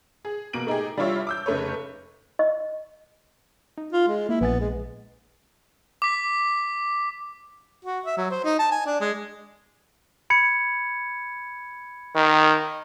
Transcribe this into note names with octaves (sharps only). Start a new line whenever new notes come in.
G#4
B2 A#3 D7 F#7
A3 D#4 G4 G#4
G3 D4 E4 F4 C#5 E5
D6 E6 G6
F1 C#3 A3 B4 C#5
D#5
D#4
F4
G#3
A#3 E4
A#1 B3 G#5 A6
G#3
D6 B6
F#4
E5
F#3
C5
D#4
A5
G#5
D4
G#3
B5 G#6 C#7
D#3